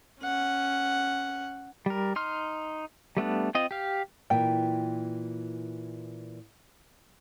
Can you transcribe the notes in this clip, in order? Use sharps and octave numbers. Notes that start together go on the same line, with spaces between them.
C#4 F#5
G3 A#4
D#4 C6 F6
G3 A3 B3 D4
C4 F4 D#5
G4 F5
A#2 E3 G5